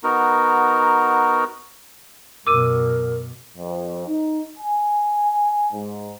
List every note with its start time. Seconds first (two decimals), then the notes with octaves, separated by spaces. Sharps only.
0.04 B3 D#4 F#4 A#4
2.47 F#2 B2 A#4 D6 E6 D#7
3.57 F2
4.07 D#4
4.58 G#5
5.72 G#2